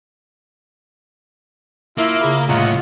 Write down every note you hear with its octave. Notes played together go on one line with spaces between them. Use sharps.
A#3 E4 F4 E5 F5
C#3 G#4 B5
C2 A2 F4 C#5 D#5 F5 F#5 A#5